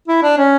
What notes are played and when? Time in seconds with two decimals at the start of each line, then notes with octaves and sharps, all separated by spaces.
0.08 E4
0.22 D4
0.38 C#4